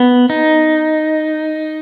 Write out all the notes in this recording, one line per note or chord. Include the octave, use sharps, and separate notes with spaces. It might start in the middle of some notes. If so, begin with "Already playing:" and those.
Already playing: B3
D#4